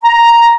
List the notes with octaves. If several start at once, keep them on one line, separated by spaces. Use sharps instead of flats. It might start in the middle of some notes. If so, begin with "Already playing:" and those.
A#5